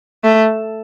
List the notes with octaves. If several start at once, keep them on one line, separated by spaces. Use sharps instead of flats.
A3